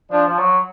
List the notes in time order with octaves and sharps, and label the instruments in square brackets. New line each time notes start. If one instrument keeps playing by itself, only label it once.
[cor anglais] F3 [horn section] D4
[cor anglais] F3
F#3